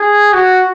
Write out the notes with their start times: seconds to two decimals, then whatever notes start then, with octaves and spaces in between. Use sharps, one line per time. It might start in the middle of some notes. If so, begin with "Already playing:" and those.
Already playing: G#4
0.33 F#4